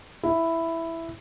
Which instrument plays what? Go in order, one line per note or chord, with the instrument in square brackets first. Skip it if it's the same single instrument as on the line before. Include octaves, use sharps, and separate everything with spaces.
[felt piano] E4